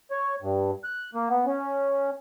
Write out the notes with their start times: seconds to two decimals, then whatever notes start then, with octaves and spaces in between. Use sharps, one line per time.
0.11 C#5
0.42 G2
0.84 F#6
1.15 A#3
1.30 B3
1.46 C#4